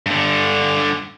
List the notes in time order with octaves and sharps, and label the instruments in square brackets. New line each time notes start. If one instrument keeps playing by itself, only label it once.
[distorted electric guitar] G2 D3